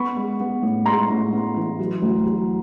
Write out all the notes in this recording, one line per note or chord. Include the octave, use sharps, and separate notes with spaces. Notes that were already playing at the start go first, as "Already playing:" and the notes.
Already playing: B3 B5 C#6
G#3
B3
A2
G#3 A#5 C6
A2
B3
E3
F#3
D2
F#3